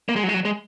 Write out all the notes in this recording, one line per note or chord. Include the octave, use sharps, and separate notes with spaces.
A#3
G#3
F#3
G#3
F#3
G#3